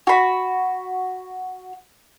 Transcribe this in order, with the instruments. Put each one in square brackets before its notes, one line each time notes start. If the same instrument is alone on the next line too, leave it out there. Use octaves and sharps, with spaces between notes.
[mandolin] F#4 B5